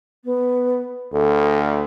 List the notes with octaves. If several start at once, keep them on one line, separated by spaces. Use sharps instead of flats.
B3
D2 A4